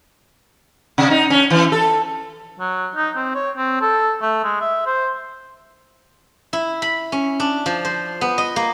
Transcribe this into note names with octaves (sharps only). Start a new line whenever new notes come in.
C3
D#4
C#4
E3
A4
F#3
D#4
C4
C#5
C4
A4
A3
G#3
E5
C5
E4
B5
C#4
D4
F3
C5
B3
D#5
A#3